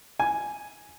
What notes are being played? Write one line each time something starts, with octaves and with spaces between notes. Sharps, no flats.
G#5